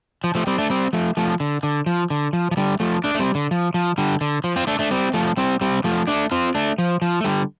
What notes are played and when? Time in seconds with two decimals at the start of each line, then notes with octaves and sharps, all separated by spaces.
0.24 F3
0.35 F3 A3
0.47 G3 C4
0.58 A3 D4
0.70 G3 C4
0.93 F3 A3
1.17 F3 A3
1.40 D3
1.63 D3
1.86 F3
2.10 D3
2.33 F3
2.51 F3
2.57 D3 G3
2.80 F3 A3
3.04 A3 D4
3.14 A3
3.19 G3 C4
3.35 D3
3.51 F3
3.74 F3
3.98 D3 G3
4.21 D3
4.44 F3
4.56 C4 F4
4.67 A3 D4
4.79 A3 D4
4.91 G3 C4
5.14 F3 A3
5.37 G3 C4
5.61 G3 C4
5.84 F3 A3
6.07 A3 D4
6.32 C4 F4
6.55 A3 D4
6.78 F3
7.02 F3
7.21 A3
7.24 D3 G3